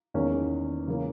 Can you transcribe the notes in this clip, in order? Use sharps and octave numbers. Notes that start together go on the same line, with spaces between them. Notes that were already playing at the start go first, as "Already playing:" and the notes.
E2 D#3 A#3 C#4
C#3 E3 A#3 C#4